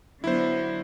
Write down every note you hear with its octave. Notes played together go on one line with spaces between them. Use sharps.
D3 F#3 B3 E4 C5